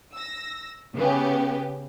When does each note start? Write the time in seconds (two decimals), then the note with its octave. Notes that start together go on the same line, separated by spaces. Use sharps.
0.14 E6 A#6
0.95 C#3 B3 C#4 G4